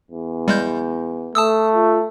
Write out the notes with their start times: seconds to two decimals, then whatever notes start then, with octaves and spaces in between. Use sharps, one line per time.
0.11 E2
0.48 G3 G#3 G6
1.35 A3 A5 D#6 E6
1.74 F4